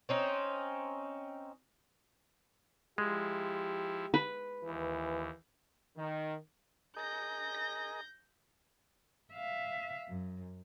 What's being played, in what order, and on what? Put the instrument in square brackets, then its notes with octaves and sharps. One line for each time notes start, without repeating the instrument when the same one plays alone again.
[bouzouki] C4 C#4 D#4
[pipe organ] F3 E4 [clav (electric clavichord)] G#3 [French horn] G4
[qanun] B4
[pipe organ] D#2 [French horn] E3
[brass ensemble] D#3
[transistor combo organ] G#4 A#4 D#5 [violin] G6 A#6
[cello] E5 F5
F#2